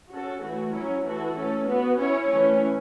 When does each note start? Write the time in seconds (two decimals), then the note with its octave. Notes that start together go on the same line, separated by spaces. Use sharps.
0.11 C#4 F#4 A4
0.42 E3 A3 F#4
0.73 F#3 C#4 E4
1.04 E3 A3 F#4 A4
1.36 A3 C#4 A4
1.67 B3 F#4 B4
1.98 C#4 E4 C#5
2.28 E3 A3 C#4